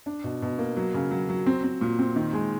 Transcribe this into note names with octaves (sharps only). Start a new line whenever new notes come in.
D4
B2
B2
A#3
F#3
C#3
F#3
F#3
C4
C4
A#2
C4
D#3
G#3